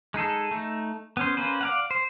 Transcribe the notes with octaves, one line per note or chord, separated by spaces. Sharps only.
G#3 D#4 G#4 A4
A3 D#4
B3 C#4 C5
A#3 C#4 B4 C5
D5 F5 F#5
C5